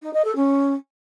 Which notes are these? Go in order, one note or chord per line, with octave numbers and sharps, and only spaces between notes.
D#4
D#5
A4
C#4